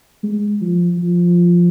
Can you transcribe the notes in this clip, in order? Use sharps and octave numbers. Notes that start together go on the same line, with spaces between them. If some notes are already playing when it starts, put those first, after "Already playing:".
G#3
F3
F3